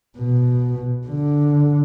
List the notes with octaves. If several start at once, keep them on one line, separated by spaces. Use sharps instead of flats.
B2
D3